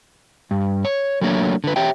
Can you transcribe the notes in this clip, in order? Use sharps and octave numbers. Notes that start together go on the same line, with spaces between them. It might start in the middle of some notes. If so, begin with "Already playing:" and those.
G2
C#5
F#3 A3 A#3 D4 B4 C#5
D3 B4
G4 C#5 E5 G5